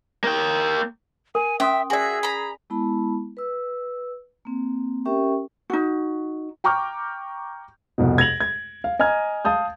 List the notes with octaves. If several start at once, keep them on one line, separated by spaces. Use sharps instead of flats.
A#3 G5
A#4 G#5
C#4 E5 G5 C6 D#6
F#4 G#4 D5 E5 G#5
A#5 B5
G#3 B3 E4 A5 B5
B4 E6
A#3 C4
C#4 G4 A#4 E5 G5 C#6
D#4 F#4
G5 A#5 C#6 D6 F6 G6
C2 F2 B2
G#6 A#6 F7 F#7
G#6
F5
D#5 G#5 A#5 F6 G#6
F5 A5 D#6 G6